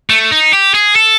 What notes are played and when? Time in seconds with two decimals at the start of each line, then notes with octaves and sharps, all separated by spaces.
0.10 A3
0.31 D#4
0.53 G4
0.74 G#4
0.96 A4